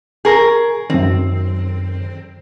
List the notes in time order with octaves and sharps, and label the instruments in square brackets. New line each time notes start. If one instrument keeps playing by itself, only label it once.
[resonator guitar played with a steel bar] G#4 A#4 [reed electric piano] G#5 C#6
[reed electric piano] F#2 D#3 [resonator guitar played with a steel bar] C4